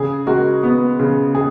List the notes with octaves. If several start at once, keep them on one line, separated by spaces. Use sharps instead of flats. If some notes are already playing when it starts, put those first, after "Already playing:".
Already playing: C#3 G#4
G#3 F#4 A#4
B3
C#3
G#4